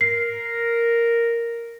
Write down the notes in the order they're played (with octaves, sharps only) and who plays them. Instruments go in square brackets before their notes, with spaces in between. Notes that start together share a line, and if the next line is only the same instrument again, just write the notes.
[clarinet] A#4 [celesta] C7